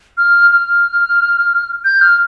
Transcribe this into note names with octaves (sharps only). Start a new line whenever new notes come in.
F6
F6
G6
F6